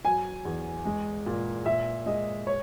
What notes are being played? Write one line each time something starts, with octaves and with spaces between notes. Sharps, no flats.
F#3 G#5
E2
G#3
A#2
A#2 E5
G#3 D#5
C#5